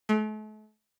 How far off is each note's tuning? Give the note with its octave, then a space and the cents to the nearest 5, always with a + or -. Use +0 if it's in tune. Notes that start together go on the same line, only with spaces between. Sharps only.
A3 -40